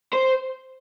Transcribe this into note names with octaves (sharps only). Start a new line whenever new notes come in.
C5